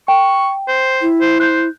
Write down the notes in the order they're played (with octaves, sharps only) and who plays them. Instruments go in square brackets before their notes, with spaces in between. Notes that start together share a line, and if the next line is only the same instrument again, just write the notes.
[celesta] G5 [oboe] C#6
[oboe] C5
[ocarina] E4
[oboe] C5
[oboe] C5 [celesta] F#6 G6